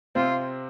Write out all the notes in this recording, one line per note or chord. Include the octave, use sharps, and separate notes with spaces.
C3 C4 F4